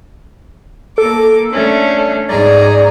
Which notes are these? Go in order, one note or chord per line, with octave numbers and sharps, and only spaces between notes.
A#3 A4 D6
A3 C#4 D4
G#2 G#4 D5 A#5